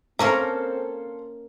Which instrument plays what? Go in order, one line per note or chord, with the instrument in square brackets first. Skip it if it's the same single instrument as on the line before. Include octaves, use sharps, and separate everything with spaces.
[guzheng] A#3 C#4 A#4 [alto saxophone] C4 [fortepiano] A4 C5 F5 [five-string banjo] A#5